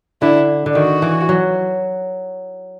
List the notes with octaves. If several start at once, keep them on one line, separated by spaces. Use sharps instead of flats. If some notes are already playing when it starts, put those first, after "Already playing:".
D3 E4
D3
D#3 F#4
E3
F#3